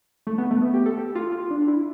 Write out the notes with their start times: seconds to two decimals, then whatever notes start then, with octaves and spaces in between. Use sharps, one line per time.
0.27 A3
0.38 B3
0.51 A3
0.61 B3
0.74 G4
0.86 A4
0.98 G4
1.15 F4
1.32 F4
1.51 D4
1.68 E4